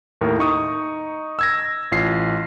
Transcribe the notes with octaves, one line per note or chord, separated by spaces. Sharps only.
D#2 A2 A#4
D#4 C#6 D#6
E6 G#6 A#6
A1 F4 C7